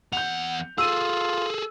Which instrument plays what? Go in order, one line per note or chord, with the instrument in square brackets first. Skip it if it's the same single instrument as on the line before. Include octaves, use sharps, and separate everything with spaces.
[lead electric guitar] E2 F#5 [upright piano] G6 F7
[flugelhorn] F4 [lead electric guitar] G#4 A4 [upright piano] E6 D#7